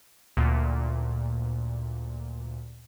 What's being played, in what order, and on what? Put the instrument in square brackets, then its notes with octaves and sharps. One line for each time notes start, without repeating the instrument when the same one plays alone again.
[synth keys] D2 A#2